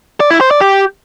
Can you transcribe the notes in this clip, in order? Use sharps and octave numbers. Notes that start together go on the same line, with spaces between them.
D5
E4
C5
D5
G4